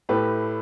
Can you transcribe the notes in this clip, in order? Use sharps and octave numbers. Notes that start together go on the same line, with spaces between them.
A2 A3 G4 B4